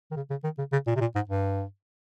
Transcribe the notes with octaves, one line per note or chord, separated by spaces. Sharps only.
D#3
C#3
C#3
D#3
C#3
C#3
A#2
C3
A#2
G#2
G2